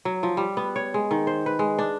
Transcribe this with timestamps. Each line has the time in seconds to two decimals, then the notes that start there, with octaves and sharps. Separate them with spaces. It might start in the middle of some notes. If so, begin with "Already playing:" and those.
0.05 F#3
0.23 F3
0.37 G3
0.57 B3
0.76 C#5
0.94 G#3
1.11 D#3
1.27 C5
1.46 B4
1.59 G#3
1.79 D4